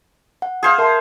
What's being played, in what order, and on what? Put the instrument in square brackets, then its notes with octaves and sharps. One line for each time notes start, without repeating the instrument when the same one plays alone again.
[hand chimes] F#5
[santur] G#4 C5 F5
[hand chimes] A#4 [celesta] E5 A5 C6